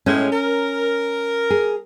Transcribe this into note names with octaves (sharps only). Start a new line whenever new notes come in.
A2 G#3 C#4
A#4
G#4